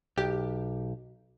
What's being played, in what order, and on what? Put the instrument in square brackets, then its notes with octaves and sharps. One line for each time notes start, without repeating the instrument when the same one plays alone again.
[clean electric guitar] B1 [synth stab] G4